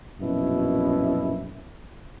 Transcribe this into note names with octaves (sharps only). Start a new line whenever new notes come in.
A#1 F#2 B2 E4